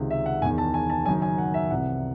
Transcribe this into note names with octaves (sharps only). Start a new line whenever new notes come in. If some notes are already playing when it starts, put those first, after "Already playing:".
Already playing: C#2 C3 D#3
E5
F#5
E1 E2 D#3 G#5
A5
G#5
A5
F#1 F#2 D#3 G#5
G#5
F#5
E5
C2 C3 E3 F#5